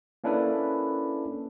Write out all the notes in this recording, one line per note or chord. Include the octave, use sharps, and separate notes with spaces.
A#3 C#4 D4 E4 A4 B4